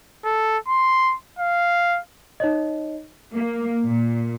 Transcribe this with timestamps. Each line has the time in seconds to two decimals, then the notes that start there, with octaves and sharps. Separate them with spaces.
0.25 A4
0.68 C6
1.39 F5
2.40 D#4 C#5 D#5
3.34 A#3
3.85 A#2